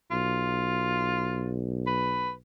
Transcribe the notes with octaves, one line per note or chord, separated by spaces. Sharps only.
B1 F4
B4